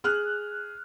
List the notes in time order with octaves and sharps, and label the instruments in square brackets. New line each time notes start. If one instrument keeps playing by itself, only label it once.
[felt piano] G#4 F6 F#6